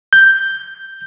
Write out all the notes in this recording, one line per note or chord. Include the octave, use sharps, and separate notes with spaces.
G6